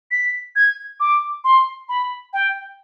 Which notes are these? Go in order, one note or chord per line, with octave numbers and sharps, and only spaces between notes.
B6
G#6
D6
C6
B5
G5